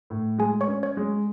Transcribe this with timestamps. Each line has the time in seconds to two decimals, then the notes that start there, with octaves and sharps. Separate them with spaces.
0.10 A2
0.38 G#3 G#4 G#5
0.61 C#5 C#6
0.68 C#4
0.83 C#5 C#6
0.97 G#3